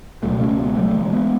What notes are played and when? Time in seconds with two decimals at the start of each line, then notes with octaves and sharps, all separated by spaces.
0.23 C#2 B2 F#3 A3
0.41 A3 C#4
0.59 G#3 B3
0.77 F#3 A3
0.94 E3 G#3
1.12 G#3 B3